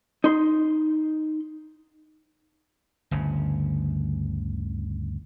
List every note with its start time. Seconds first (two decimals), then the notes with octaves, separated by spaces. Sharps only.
0.24 D#4 C6
3.11 G1 D2 C#3